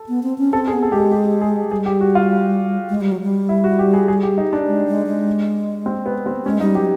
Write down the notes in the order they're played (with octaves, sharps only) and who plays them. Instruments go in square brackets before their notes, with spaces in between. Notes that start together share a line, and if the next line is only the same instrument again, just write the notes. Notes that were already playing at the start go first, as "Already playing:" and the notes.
Already playing: [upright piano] A4
[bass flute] B3
C4
C#4
[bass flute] C4 [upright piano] A4
[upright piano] G#4
[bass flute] B3
[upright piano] A4
[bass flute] G#3 [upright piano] G4
[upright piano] G#4
G4
G#4
[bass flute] G3 [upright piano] G#4
[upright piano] G4
F#4
F4
[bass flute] G#3
G3
F#3
G3
[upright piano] E4
F#4
G4
G#4
G#4
G4
D#4
D4
[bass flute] G#3
G#3
G#3
[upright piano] C4
B3
C4
[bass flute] G#3 [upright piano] C#4
[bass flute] G3 [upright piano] D#4
[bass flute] F#3 [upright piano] G4